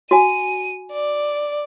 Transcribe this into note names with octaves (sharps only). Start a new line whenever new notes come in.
F#4 G#5 D#7
D5